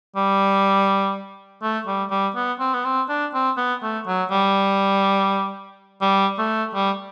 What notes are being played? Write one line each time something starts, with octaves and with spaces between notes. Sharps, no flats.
G3
A3
G3
G3
B3
C4
B3
C4
D4
C4
B3
A3
F#3
G3
G3
A3
G3